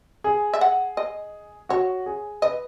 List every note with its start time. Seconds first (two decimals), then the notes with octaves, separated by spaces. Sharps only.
0.24 G#4
0.53 E5
0.61 F#5
0.97 D#5
1.69 F#4 C#5
2.06 G#4
2.42 B4 D#5